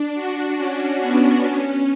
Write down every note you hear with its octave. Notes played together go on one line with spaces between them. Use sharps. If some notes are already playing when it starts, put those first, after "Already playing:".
Already playing: D4
F#4
C#4
B3
C#4